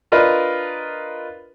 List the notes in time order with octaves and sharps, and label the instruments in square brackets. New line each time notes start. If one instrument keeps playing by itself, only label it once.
[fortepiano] D4 F4 A#4 B4 D#5